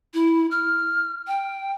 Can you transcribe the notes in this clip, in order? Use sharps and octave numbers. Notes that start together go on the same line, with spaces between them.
E4
F6
G5